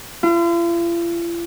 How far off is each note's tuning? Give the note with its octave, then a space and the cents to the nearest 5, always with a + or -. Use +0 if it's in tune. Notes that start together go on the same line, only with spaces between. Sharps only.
F4 -45